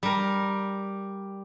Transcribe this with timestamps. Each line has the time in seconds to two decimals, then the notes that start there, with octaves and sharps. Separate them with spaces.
0.03 G3 A#4